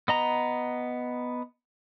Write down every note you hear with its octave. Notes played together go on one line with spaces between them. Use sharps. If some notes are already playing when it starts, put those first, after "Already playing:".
B3 D#5 A#5